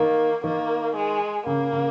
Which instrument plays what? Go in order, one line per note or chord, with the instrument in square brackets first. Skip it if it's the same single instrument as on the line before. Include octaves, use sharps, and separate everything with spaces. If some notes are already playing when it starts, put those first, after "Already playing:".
Already playing: [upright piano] D#3 [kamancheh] A#3
[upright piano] D#3 [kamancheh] A#3
[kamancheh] G#3
[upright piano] C#3 [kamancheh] A#3
[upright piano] C#3